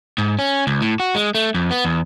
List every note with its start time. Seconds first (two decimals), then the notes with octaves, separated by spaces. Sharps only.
0.18 G#2
0.39 C#4
0.67 C#2
0.82 A2
1.00 F#4
1.15 G#3
1.35 A3
1.54 F2
1.71 B3
1.85 E2